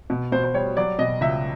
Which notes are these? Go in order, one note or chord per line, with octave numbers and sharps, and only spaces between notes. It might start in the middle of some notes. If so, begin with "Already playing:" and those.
B2
B2 C5
C5
G3 C#5
F#3 D5
B2 D#5
C#2 E5